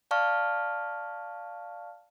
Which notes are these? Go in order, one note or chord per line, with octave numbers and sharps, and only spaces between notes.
D5 F5 A5 C#6 F6